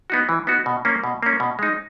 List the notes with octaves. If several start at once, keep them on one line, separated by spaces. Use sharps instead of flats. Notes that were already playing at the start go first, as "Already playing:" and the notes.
B3 D#4 F#4
E3
B3 D#4 F#4
B2
A#3 C#4
B2
A#3 C#4
B2
G#3 D#4